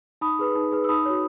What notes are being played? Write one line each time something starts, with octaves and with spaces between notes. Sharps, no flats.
D#4 B5 D#6
G#4 B4
D#4
G#4 B4
E6
D#4 B5 D#6
F#4 C#5